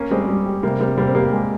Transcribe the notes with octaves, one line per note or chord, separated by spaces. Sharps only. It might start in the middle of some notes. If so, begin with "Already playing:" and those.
Already playing: A#3 C#4
G3 G#3 C4
G3
G4
C3 G3 A#3
G3 A#3 C4
C3 G3 A#3
C4
G3 A#3 G4
G#3